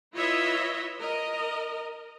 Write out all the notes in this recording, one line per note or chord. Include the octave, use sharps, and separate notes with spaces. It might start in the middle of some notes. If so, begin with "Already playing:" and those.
E4 F4 B4 C#5 D#5 E5
A#4 D#5